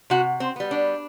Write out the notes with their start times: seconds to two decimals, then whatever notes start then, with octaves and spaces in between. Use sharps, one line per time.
0.10 C3 F#4
0.40 C4
0.56 G3 B3
0.71 D4